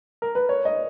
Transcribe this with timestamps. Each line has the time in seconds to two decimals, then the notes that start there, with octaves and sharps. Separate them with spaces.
0.22 A#4
0.35 B4
0.49 C#5
0.65 D#5